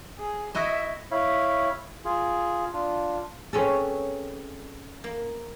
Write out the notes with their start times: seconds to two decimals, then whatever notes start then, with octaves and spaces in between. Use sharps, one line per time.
0.19 G#4
0.55 E4 F#4 D#5 E5
1.11 E4 C#5 F5 B5
2.05 F4 G#4
2.73 D4 F4
3.53 C4 C#4 G#4 A4 B4 C#5
5.04 A#3